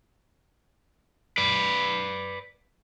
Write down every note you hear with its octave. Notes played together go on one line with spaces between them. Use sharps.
B4 D5